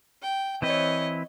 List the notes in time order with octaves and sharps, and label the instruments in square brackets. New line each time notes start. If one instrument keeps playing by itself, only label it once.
[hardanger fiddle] G5
[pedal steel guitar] E3 C4 B4 [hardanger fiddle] C#5 D#5